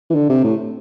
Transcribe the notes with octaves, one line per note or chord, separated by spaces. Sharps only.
E3
D3
C3
A2